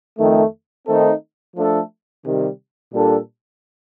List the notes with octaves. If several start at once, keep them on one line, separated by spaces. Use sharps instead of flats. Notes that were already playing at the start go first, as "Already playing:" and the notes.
F2 D#3 A3
D#3 A3 C4 D#4 A4
F3 A3 D4 A4
C3 D#3 G3
A#2 G3 D4 A4